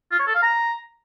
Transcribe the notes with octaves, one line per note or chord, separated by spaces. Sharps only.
F4
C#5
A4
F5
A#5